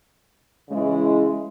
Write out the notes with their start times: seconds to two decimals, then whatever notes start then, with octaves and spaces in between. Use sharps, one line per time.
0.69 C#3 E3 G#3 E4